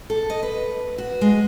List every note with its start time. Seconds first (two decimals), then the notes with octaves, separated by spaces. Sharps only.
0.10 A4
0.30 D#5
0.43 B4
0.98 F#4
1.21 G#3